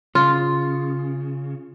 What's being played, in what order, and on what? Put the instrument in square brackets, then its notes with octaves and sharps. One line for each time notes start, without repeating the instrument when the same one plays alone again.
[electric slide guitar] C#3 [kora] F4